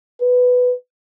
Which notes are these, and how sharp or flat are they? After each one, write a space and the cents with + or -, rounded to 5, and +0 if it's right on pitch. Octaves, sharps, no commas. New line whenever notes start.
B4 +10